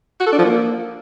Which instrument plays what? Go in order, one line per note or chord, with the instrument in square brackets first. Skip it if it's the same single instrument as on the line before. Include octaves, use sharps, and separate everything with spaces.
[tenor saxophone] F#4
A4
D4
F3
A#3